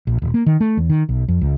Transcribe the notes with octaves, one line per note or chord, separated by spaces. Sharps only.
A#1
D#1
A#3
D#3
A3
E2
D#3
B1
F2
C#2